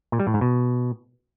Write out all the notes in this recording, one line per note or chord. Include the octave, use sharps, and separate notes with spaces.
A#2
G3
A2
G#2
B2